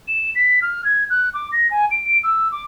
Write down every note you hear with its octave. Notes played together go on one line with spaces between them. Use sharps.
E7
B6
F6
G#6
F#6
D6
A#6
G#5
D7
D7
E6
D6